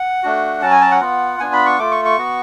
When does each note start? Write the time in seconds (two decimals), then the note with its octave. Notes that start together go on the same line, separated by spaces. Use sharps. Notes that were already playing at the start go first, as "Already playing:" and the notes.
Already playing: F#5
0.23 A3 D4 F#4
0.62 F#3 C#4 F#4 A5
0.71 G#5
0.81 A5
0.91 F#5
1.01 B3 F4
1.40 B3 D4 F4 G#5
1.53 B5
1.66 C#6
1.78 A3 F4 D6
1.91 C#6
2.05 C#6
2.18 B3 F#4